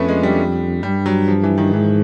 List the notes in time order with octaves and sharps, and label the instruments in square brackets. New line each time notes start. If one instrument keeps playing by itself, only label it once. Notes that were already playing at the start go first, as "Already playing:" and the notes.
Already playing: [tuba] F2 [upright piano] A3 B3 C#4 D4
[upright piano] G#3
G3
[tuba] G2 [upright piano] G3
[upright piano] F#3
F3
E3
D#3
[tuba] G#2 [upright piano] E3